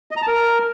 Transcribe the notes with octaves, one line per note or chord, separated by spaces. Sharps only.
D#5
A#5
A5
A#4